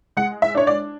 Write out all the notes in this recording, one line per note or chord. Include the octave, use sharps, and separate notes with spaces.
G#3 F#5
E5
D4 C#5
D5